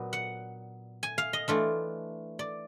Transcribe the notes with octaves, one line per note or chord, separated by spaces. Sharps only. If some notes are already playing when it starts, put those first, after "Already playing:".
Already playing: A#2 F#3 B3 D4
F#5
G#5
F5
D#5
E3 A3 D4 F4
D5